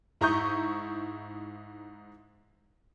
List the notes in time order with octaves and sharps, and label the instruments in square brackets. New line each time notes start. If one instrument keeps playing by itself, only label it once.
[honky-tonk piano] G#2 E4 A#5 C#6 D#6 G6